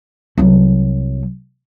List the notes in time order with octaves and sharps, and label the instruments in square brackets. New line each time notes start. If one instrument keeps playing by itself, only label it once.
[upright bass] C2 F#3